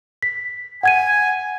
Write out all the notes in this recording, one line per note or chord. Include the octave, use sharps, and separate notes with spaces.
B6
F#5 G#5 G#6 D#7